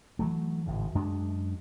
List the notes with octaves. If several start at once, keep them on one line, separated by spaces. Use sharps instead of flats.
E3 F#3 A3
G#1 A2 C#3
F#2 G#3 D4